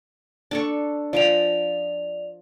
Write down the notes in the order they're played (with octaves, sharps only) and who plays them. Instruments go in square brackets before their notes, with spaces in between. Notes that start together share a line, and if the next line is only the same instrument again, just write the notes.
[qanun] D4 A4 C#6
[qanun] F3 G5 A#5 [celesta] D5 F7